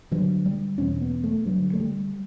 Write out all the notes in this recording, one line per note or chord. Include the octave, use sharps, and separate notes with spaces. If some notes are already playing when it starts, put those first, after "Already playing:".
G2 D3 F#3
G3
E2 B2 C#4
B3
A3
G2 D3 F#3
A3
G3